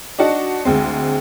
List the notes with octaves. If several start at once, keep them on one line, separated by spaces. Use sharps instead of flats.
D4 D#4 F#4 F#5 A5
D2 G#3 C4